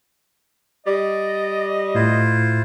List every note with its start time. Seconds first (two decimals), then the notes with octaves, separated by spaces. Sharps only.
0.86 G3 D5 D#5
1.95 A2 E4 F4 C5